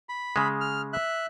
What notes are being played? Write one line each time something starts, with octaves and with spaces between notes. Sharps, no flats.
B5
C#3 G#3
F6
E5 F#6